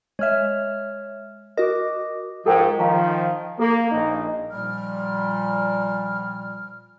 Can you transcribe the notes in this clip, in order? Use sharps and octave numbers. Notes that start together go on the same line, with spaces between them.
G#3 C#5 E5 F6
F#4 A#4 D#5 D6
G#2 F3 A4 A#4 G5
D#3 F3 F5 A#5 C#6
A#3 A4
A#1 D#4
A#2 F3 G3 F6